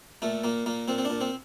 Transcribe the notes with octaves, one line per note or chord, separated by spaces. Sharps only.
A#2 A3
A#2 A#3
A#2 A#3
A#2 C4
C4
D4
A#2
C4